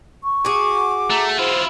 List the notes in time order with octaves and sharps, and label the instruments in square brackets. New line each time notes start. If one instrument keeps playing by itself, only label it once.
[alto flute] C#6
[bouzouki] F#4 G#4 [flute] D6
[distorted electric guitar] A3 [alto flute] A#5
[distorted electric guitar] E4 F4 [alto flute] C5